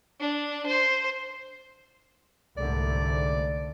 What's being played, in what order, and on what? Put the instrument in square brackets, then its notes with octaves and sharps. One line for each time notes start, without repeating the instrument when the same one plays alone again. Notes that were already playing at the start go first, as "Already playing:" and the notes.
[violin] D4
C5
[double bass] C2 [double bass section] G#2 D3 A3 [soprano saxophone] D5